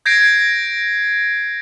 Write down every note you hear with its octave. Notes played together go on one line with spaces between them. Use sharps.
G6 G#6 A#6 C7 D7